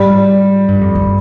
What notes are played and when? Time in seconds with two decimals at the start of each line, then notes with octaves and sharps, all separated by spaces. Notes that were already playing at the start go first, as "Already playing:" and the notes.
Already playing: G#2 G3
0.68 G2
0.81 F2
0.95 G2